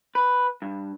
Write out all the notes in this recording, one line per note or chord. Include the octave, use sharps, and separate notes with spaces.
B4
G2